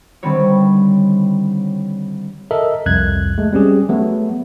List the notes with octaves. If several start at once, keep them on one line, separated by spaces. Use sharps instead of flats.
D3 D#3 G3 C4 B4 C#5
A4 A#4 D#5 E5
C2 F2 F#6 G#6
G#3 A3
G3 C4 C#4 G4 G#4
F#3 A3 B3